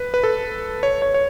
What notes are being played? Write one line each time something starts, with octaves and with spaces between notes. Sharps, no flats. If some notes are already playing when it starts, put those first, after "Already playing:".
Already playing: B4
B4
A4
C#5
C#5
C#5